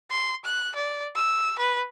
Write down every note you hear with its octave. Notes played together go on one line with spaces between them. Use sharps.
C6
F#6
D5
E6
B4